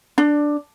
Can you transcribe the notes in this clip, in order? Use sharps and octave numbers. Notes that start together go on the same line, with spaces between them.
D4